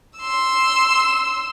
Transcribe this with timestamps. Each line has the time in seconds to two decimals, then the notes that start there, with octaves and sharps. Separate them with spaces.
0.18 C6 E6